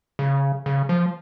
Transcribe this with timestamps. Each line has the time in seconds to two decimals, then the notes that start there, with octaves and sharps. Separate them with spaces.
0.19 C#3
0.66 C#3
0.89 F3